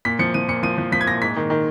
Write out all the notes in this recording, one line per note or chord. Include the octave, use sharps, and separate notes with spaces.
A#2 B6
F3 C#7
F3 D#7
A#2 C#7
F3 D#7
F3
F3 B6
G#6
A#2 A#6
G#2 B6
D#3
D#3